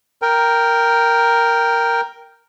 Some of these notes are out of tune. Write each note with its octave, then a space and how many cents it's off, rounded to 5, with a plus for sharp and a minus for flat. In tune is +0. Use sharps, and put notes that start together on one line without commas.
A#4 +0 G5 +0